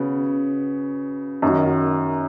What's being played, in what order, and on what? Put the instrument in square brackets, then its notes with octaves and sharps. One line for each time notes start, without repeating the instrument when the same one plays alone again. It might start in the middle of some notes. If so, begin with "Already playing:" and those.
Already playing: [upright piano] C#3 B3 F#4
F#2 D#3 F#3